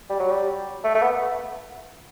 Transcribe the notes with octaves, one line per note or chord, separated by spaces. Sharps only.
G3
F#3
G3
A3
A3
B3